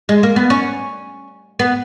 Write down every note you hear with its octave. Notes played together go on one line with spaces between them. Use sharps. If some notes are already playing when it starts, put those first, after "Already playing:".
G#3
A#3
B3
C#4
B3